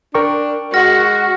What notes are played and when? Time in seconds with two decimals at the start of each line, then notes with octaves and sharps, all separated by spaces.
0.15 D4 A#4 G5 C#6
0.74 G#3 F#4 F6 A#6